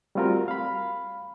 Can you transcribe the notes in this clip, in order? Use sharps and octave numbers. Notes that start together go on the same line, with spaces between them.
G3 A3 C4 F4 F#4 A#4
F5 B5